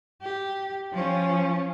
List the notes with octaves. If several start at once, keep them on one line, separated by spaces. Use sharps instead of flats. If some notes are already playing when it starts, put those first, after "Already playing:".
G4
F3 C#4